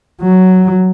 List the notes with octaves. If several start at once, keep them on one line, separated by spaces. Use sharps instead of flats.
F#3